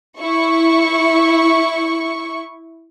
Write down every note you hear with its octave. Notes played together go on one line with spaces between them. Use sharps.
E4 C#6